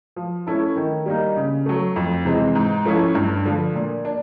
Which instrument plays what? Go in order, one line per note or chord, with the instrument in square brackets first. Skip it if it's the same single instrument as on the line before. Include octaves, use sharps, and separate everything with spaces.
[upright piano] F3
A3 C#4 E4 A4
D#3
G3 A#3 D#4
C#3
F#3 A3
F2
C3 E3 G#3 C4
G#2
F3 A3 C#4 E4
G2
D3 F3
A#2
D4